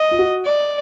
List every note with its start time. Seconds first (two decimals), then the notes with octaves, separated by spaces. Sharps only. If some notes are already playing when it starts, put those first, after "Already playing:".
Already playing: D#5
0.11 F4
0.19 F#4
0.45 D5